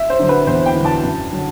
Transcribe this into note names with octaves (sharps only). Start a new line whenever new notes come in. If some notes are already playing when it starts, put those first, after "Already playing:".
Already playing: E5
C5
D3 F#3
B4
E2 C5
G5
D3 F#3
A5
F#2
D3 F#3